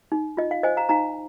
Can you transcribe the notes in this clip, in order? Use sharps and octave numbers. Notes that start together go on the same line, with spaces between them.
D#4
F4 D#5
F5
C5 D#5 G#5
F5 A#5
D#4 F5 A#5